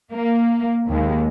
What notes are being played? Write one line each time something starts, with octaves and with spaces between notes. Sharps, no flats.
A#3
D#2 G#3